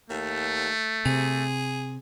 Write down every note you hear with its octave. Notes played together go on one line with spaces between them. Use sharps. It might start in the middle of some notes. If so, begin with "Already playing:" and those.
D#2 A3
C3 G#4